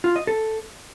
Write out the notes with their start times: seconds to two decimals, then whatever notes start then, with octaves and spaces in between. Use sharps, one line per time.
0.04 F4
0.16 D#5
0.27 A4